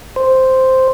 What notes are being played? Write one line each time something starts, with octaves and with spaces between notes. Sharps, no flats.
C5